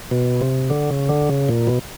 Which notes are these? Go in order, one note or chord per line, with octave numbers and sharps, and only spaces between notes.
B2
C3
D3
C#3
D3
C#3
A#2
B2